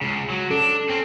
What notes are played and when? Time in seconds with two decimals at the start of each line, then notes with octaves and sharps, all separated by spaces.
0.01 C#2 C#3
0.30 F#3
0.51 C#4 D4 A4
0.90 C4 C#4